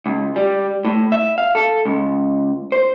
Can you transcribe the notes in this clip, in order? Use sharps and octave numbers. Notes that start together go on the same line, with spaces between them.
C#2
G3
A2
E5
F5
A4
C#2
C5